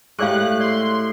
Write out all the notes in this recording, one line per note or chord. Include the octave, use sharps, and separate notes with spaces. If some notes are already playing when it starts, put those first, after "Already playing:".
A2 G#3 G4 G#4 D5 F5 F#6
D5 C6